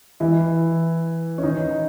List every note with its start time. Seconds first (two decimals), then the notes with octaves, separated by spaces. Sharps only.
0.20 E3 E4
1.38 C#4
1.43 D#3 D#4